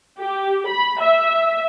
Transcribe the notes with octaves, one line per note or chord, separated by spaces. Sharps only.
G4
B5
E5